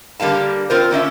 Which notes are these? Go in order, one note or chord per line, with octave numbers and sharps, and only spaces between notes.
D3 G3 A#3 F5 A5
C4 F4 A#4 C5
A#3 C#4 D4 E5